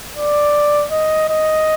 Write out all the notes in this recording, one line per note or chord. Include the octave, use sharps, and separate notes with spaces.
D5
D#5
D#5